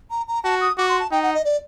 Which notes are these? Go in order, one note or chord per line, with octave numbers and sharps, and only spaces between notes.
A#5
A#5
F#4 A5
D#6
F#4 D6
C6
A5
D#4 G5
F#5
D#5
D5